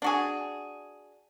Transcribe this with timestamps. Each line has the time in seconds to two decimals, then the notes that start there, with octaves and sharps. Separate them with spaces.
0.02 D4 F#4 G#4